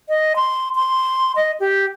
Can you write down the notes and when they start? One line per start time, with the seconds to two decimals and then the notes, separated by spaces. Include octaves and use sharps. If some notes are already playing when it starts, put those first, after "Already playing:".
0.09 D#5
0.36 C6
0.75 C6
1.36 D#5
1.60 G4